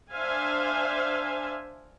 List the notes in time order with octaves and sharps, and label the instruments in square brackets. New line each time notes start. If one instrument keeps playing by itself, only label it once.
[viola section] D4 C5 E5 F5 G#5